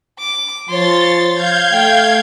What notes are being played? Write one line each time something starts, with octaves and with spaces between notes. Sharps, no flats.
D6
F3 C#5 C6 A6
F5 G6 G#6
A3 G5